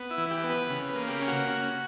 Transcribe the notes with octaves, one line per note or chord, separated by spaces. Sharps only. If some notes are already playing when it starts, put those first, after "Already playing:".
Already playing: B3
E4
E3
G4
B3
B4
C#3
B4
A#3
G4
C#4
F#4
C#4